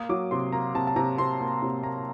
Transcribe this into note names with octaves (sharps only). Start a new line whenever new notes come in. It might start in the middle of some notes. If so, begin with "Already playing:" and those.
Already playing: A#3 D#6
F#3 D6
C3 C6
A#3 A#5
C3 A5
A5
C3 A#5
C3 C6
A#3
C3
A#3 A#5